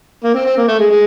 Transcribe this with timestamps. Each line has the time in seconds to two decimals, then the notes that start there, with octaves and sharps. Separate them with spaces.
0.24 A#3
0.35 C4
0.46 C4
0.57 A#3
0.68 A3
0.79 G#3
0.91 G#3